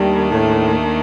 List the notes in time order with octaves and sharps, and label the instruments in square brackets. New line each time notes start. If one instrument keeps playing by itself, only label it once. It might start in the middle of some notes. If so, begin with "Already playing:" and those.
Already playing: [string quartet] D#2 D#3 A3 D4 [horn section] G3
[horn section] A2